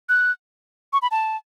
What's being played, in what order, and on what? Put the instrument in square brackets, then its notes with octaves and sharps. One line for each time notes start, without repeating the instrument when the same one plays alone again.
[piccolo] F#6
C#6
B5
A5